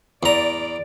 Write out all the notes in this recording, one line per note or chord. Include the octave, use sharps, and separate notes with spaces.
E2 D5 A#5